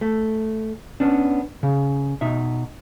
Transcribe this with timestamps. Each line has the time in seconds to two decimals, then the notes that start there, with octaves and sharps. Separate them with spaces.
0.01 A3
1.00 B3 C#4 D4
1.63 C#3
2.21 B2 D#4 E5